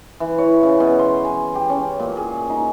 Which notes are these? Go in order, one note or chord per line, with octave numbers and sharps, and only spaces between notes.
E3
C#5
C#3
B2
C6
G#5
G4
C#4
A#2
G#4
D#4